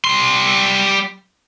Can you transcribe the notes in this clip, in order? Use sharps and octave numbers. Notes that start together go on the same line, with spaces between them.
G3 C6